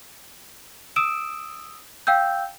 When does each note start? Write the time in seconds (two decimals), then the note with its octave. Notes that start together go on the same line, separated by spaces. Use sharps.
0.96 D#6 E6 D7 E7
2.07 F5 G5 E6 G6